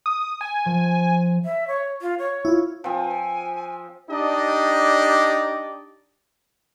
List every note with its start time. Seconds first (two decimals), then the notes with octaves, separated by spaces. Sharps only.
0.06 D#6
0.41 G#5
0.66 F3
1.44 E5
1.68 C#5
2.01 F4
2.19 C#5
2.45 E4 F4
2.84 F3 C4 G#5
4.10 D4 D#4 G4 D5 D#5